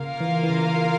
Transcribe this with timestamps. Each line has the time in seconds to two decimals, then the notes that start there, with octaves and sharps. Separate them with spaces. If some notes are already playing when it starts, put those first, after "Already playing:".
Already playing: C#3 A#3 F4 A#4 F5
0.20 E3
0.44 E3
0.49 C#3